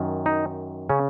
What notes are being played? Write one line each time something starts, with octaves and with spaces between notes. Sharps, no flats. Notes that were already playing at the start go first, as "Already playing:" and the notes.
Already playing: F#2 D#3
D#4
C#3 C#4